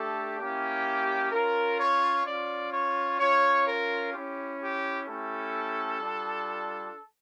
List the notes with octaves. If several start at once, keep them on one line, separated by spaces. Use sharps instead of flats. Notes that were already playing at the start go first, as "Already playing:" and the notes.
Already playing: A3 D4 G4 A4
A#3 C#4 E4 G4
C#4 F4 A#4
C#5
C#4 F4 D5
C#5
C#4 F4 C#5
A#4
C#4 E4 G4
G4
A3 C#4 E4 G4 A4
G3 D4 F4